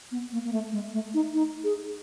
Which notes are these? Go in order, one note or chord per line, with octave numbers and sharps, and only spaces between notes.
B3
A#3
A#3
A3
G#3
A3
D#4
D#4
G#4